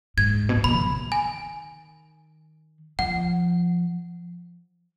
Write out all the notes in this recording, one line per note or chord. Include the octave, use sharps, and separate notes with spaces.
G#2 G#6
B2
A#2
B2 B5
F3
D#3
G#5
F3 F#5